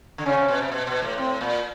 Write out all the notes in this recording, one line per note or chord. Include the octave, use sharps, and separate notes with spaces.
D3
C#3 C#4
C3
B2
C3
B2
B2
A2
A2 C4
A#2